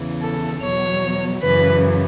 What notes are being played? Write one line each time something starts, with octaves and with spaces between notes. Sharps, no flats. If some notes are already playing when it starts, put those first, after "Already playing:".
Already playing: E2 C#3 E3
A4
E2 B2 F#3 C#5
F#2 C#3 E3 B4